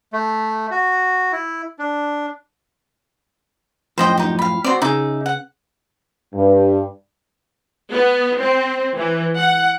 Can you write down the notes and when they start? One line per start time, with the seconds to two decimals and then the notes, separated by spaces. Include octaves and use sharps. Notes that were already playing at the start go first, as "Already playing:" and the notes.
0.13 A3
0.71 F#4
1.32 E4
1.79 D4
3.98 F#2 A2 F3 C5 D#5 G5
4.18 D#4 G4
4.39 F5 B5
4.64 C4 F#4 D5 C6
4.82 C#3 D#4 G#4 E5 D6
5.26 F#5
6.34 G2
7.93 B3
8.40 C4
8.97 E3
9.39 F#5